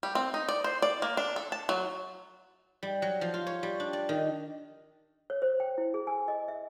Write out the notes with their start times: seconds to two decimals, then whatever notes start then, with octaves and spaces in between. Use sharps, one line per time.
0.03 G3
0.15 C4
0.34 D#4
0.49 D5
0.64 C5
0.82 D5
1.02 A#3
1.17 D4
1.36 A4
1.52 A5
1.69 F#3
2.83 G3
3.02 F#3
3.21 F3
3.34 F4
3.47 C#5
3.63 G3
3.80 D4
3.93 D5
4.09 D#3
5.30 C#5
5.42 C5
5.60 G5
5.78 E4
5.94 G#4
6.07 G#5
6.28 D#5
6.48 E5